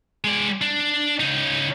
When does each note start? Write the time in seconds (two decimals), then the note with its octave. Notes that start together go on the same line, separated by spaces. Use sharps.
0.24 G#3 D5
0.61 D4
1.20 C#3 D#4